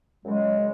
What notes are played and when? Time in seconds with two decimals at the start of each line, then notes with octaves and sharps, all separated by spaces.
0.24 F#2 C#3 F#3 G#3
0.56 C#3 F#3